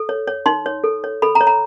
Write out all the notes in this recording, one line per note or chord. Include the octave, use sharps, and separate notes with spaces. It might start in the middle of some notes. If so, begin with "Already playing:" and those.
Already playing: A4
C#5
C#5
D#4 C6
C#5
A4
C#5
A4 B5
A#5
C#5
A#5